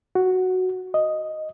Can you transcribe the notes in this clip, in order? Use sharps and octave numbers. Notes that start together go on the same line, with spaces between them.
F#4
D#5